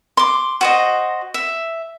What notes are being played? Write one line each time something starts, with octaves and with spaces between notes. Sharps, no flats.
C6 D6
F#4 C5 D#5
E5